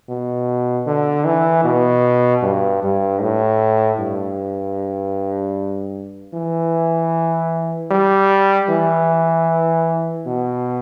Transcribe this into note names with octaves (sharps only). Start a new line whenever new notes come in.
B2
D3
E3
B2
G2
G2
A2
G2
E3
G3
E3
B2